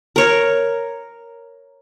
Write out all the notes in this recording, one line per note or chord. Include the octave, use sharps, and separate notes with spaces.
A#4 C#5